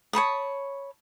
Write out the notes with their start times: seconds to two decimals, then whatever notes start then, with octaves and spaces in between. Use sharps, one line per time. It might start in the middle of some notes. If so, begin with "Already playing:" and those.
0.13 C#5 A5 B5 D#6